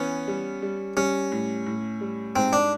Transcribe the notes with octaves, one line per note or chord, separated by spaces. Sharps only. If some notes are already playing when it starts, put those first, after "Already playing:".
Already playing: E3 B3 C#4
G3
G3
G3 C#4
A2
A2
G3
G#2 C4
D4